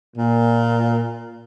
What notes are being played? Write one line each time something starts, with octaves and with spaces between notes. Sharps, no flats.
A#2